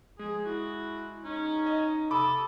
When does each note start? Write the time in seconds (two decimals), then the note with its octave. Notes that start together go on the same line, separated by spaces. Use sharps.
0.19 F3 G#3 G#4
0.45 E4 F#4
1.25 C#4 D#4
1.66 D#5
2.11 C3 A4 B5 D6 D#6